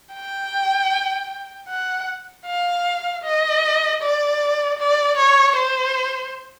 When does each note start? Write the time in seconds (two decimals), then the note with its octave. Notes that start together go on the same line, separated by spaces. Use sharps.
0.14 G5
1.69 F#5
2.46 F5
3.24 D#5
4.02 D5
4.79 D5
5.17 C#5
5.56 C5